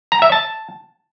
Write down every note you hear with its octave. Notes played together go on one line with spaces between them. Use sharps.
A#5
E5
A5